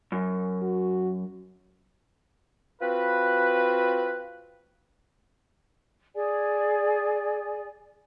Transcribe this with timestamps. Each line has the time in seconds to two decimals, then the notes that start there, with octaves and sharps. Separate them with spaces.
0.12 F#2
0.62 F#4
2.81 C4 F4 F#4 B4
6.14 G#4 D5 G#5